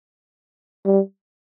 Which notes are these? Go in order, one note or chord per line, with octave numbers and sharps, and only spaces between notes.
G3